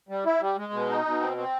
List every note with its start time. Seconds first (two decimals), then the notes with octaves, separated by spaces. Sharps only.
0.09 G3
0.25 E4
0.41 G3
0.58 G#3
0.73 B2
0.90 D#4
1.05 B2
1.21 C4
1.37 C4